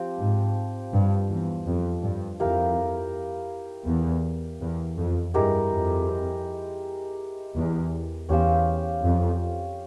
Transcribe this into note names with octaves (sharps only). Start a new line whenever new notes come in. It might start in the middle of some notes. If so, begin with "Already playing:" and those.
Already playing: F3 C4 G4
G#2
G2
E2
F2
G2
F2 E4 G4 A#4 F5
E2
E2
F2
G2 G#3 E4 G4 A#4
F2
E2
E2 C#4 G4 C5 F5
F2